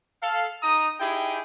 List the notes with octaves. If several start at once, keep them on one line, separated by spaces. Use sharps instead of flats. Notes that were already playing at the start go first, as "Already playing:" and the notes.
A4 F5
D#4 A#5 D#6
D#4 E4 G4 G#4 G5